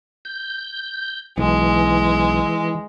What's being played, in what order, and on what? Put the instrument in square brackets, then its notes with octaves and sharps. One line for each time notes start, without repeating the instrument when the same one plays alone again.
[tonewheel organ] G6
[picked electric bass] B1 [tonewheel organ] E3 [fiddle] G#3